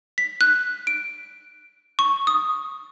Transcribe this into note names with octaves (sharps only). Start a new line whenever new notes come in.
B6
F#6
D7
C#6
D#6